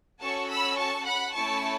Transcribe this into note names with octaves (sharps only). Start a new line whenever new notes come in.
C#4 F#4 A4 A5 C#6
B5 E6
A5 C#6
F#5 B5
A3 C#4 E4 A5 C#6